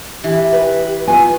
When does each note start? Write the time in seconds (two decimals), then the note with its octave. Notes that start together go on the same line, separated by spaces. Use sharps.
0.24 E3 G4
0.52 B4
1.07 D#3 B3 F4 G#5